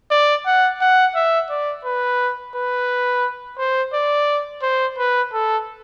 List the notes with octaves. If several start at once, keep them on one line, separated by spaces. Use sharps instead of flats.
D5
F#5
F#5
E5
D5
B4
B4
C5
D5
C5
B4
A4